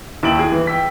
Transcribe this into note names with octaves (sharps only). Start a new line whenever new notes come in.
D#2 E4 D7 F#7
G#4
E3
G5 E6 B6